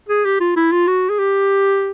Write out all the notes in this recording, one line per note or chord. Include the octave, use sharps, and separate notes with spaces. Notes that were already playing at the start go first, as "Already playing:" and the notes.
G#4
G4
F4
E4
F4
F#4
G#4
G4